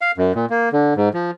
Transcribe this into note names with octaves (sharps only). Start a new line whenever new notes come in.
F5
F#2
A#2
A#3
D3
G#2
F3